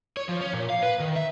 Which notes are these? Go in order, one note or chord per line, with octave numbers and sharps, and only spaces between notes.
C#5
F3
C#4
A#2
F5
B4
D#3
E5